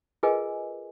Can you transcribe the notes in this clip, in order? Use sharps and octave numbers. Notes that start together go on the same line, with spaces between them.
F4 G#4 A#4 B4 D#5 G#5